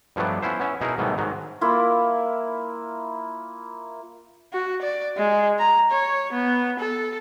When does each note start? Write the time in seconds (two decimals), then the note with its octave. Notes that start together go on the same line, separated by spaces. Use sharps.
0.16 G2 F3 F#3 A3 B3 D4
0.42 B3 C#4 E4 C5
0.60 B3 C#4 E5
0.81 B2 D#4 E4 G#4 A#4
0.98 G#2 B2 D#3 F#3 G3 A3
1.18 G#2 D#3 F#3
1.61 A#3 E4 F4
4.53 F#4
4.82 D5
5.17 G#3
5.59 A#5
5.91 C#5
6.33 B3
6.80 A4